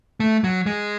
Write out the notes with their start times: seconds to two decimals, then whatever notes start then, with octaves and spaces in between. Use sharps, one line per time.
0.20 A3
0.44 F#3
0.66 G#3